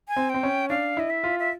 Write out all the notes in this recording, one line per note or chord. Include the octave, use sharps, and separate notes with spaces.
G#5
C4
C4 G5
C#4
D4 F5
E4 D#5
E5
F4
E5